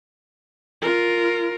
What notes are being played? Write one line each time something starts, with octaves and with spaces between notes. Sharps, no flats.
F4 A#4